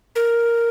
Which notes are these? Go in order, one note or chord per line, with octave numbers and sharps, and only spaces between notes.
A#4